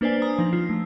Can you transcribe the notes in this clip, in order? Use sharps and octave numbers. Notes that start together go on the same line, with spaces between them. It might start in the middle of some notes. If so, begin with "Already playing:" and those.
A#3 D4 B4 C5 D5 G#5
G#5 A#5 D#6
F3 D#4
F4
A3